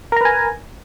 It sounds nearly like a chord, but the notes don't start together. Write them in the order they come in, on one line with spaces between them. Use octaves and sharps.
A#4 A#5 B4 G#5